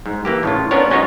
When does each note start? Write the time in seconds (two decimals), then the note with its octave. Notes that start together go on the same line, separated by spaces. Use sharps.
0.06 G#2
0.25 E3 A#3 G4
0.43 A2 C#3 F4
0.71 B3 C#4 D4 F4 A#4 C#5
0.91 G#3 C#4 D#4 F4 F#4 C#5